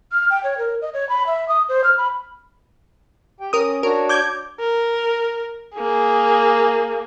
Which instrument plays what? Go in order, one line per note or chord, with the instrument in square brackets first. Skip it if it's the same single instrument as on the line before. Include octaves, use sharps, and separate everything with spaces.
[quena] F6
G5
C#5
A#4
D#5
C#5
B5
E5
D#6
C5
F6
B5
[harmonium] G4 G5
[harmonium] C#4 [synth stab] A#4 D#6
[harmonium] D4 F#4 C#5 [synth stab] A#4
[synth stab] D6 G6 G#6
[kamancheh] A#4
A#3 G#4